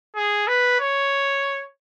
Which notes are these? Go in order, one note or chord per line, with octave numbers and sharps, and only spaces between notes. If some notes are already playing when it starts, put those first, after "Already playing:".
G#4
B4
C#5